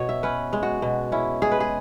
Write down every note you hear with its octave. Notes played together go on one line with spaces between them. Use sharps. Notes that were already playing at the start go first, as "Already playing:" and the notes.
Already playing: B2 C#5
E5
C#4 B4
G#3
F#4
B2
C#4 E4
G#3 G#4
B4
G#4